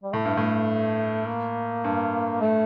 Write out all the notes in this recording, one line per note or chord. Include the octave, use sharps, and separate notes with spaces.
G3
A2 A3
G2
A2
A#3
G2
A3